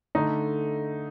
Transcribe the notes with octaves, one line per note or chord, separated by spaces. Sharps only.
D3 A3 D#4